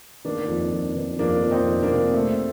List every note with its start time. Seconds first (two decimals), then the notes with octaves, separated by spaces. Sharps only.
0.25 D#3 A#3 D4
0.48 F2
0.72 F2
0.96 D#3
1.19 F2 A#3 D4
1.42 F2
1.51 C4 D#4
1.67 F2
1.83 A#3 D4
1.90 C3
2.14 C3 A3 C4